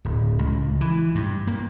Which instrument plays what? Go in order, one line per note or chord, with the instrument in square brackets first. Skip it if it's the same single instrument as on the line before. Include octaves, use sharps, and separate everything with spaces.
[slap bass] D1
C#2
E3
G2
A#3